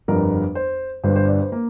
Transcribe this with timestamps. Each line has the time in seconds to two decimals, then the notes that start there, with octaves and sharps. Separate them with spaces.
0.08 G1 F2 D3 G3 A#4
0.55 C5
1.04 G1 G2 G3 C5
1.16 C5
1.28 D5
1.40 C5
1.52 A#3